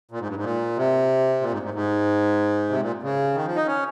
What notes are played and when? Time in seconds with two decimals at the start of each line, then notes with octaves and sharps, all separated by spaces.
0.11 A#2
0.20 G#2
0.27 G2
0.36 G#2
0.43 A#2
0.77 C3
1.41 A#2
1.52 G#2
1.62 G#2
1.74 G#2
2.69 C3
2.81 A#2
3.02 C#3
3.35 D#3
3.46 F3
3.56 D#4
3.67 C#4